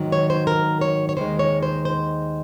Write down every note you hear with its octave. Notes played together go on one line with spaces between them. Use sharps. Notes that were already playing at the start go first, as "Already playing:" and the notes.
Already playing: G#2 D#3 F#3
C#5
C5
A#4
C#5
C#5
D#2 D#3 G#3 C5
C#5
C5
C5